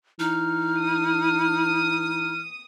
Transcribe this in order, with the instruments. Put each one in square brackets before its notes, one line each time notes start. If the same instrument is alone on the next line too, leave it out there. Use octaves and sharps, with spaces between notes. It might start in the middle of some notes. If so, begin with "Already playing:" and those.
[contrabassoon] E3 [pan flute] D#4 [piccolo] F6
[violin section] D#6